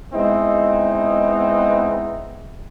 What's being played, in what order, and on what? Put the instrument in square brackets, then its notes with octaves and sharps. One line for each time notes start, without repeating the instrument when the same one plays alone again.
[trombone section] G#3 B3 C4 D#4 E4